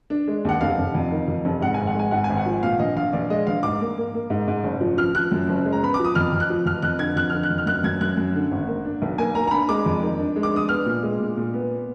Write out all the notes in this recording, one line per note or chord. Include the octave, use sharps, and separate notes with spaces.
D4
G#3
D#2 F#5
F1 F5
F1
F2
D#3
F2
F1
G#2 F#5
G#1 G#5
F#5
G#3 G#5
G#2 F#5
G#5
G#1
F#5
F3
A#2 F5
A#1 D#5
A#1 F5
A#1 D5
G#3 D#5
A#1 F5
G#2 D6
A#3
A#3
A#3
G#2
G#2
F#1
F3
F3 F6
F3 F#6
F#2
F#1
G#3
A#5
B3 B5
D6
F3
D#6
F2 F6
F2
F#6
F3
F2 F6
F2 F#6
D3 G#6
F2 F#6
D3 F6
F#6
F2
F6
F#2 F#6
F#2 G#6
F#2 F#6
F#2
D3
G#1
A#3
D4
B1
A#3 G#5
A#3 A#5
A#5
D4 B5
G#3 D6
F2
D#3
D4
G#3
D6
D4 D#6
B3 F6
A#2
G#3
A#2
A#2
B3